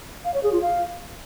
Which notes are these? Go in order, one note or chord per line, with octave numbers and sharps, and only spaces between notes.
F5
C#5
G#4
F4
F5